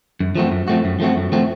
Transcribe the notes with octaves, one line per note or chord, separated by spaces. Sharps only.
F#2
F3 A3 C4 F#4
F#2
F3 A3 C4 F#4
F#2
F3 A3 C4 F#4
F#2
F3 A3 C4 F#4